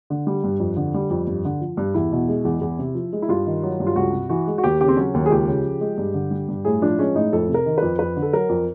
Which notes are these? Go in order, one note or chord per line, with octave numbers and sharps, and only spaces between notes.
D3
G3
G2
F2
D3
G3
F2
G2
D3
F3
G2
E2 E4
B2
G#3
E2
E2
C3
F3
G#3
E4
G2 F4
D#3
F#3
G2
F4
C#2 F#4
C3
E3 F#4
G#3
F#4
D#2 G4
C#3 G4
C4
F#3 C#4
D#2
G#4
C#2 G4
C#3
F3
G#3
G2
D3
G3
G2
A2 G#4
F3 D4
G#3 C#4
A2 D#4
F2 A4
C3
A#4
D#3
F2 B4
F2 B4
D3
A4
F#3 A#4
F2